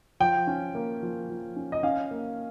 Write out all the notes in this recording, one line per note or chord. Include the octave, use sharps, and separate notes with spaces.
F3 G5
C#4
A#3
F3
F3
C#4
D#5
C#4 F5
A#3